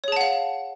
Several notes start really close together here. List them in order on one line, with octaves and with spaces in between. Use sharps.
C#5 G#4 A5 F#5 F5